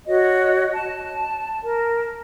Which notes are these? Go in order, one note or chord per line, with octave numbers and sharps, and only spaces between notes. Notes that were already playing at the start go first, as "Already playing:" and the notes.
F#4 C#5 D#5
A5
A#4